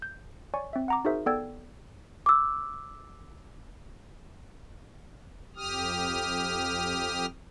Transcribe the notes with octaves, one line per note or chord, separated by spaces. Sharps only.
G6
C#5 D5 G#5 C#6
C4 E5
F#5 A#5 D6
D#4 F#4 G#4 A#4 C5 E5
B3 A4 D5 G5 E6 G#6
D6 E6
F2 G4 D#6 F6